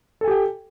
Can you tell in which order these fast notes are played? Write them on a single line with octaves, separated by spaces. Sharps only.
A4 G#5 G4 G5